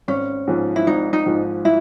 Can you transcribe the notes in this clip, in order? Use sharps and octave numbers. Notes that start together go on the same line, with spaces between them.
G#1 C#4
G#2 F3
E4
G#1 D#4
D#4
G#2 F3
E4